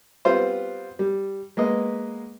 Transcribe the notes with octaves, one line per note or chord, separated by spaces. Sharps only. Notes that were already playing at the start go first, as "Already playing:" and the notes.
G3 B3 C4 F4 C5
G3
G#3 A#3 B3 D#5